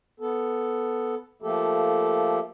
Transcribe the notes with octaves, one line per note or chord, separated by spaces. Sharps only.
B3 A4
F3 A3 A#3 G4 A4